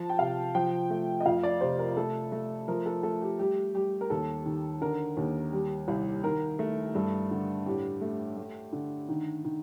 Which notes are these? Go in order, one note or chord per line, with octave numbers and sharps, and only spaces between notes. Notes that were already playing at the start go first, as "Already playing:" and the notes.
Already playing: F3 A5
G5
C3 F5
F3 G5
A3
D#5
F2 F5
D5
C3 C5
A#4
A3 A4
A3
F3 A#4
A4
A3 A4
G4
G3 G4
G3 G4
A#4
D#2 A4
D#3
D3 A#4
D#2
G3
C2
D#3 A#4
A3
G2 A4
D3
A2 G4
A3
A3
D3
D#3
D#3